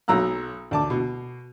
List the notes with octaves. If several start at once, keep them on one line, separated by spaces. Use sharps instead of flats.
B1 F#3 A#5 E6 F#6
D2 A5 D6
B2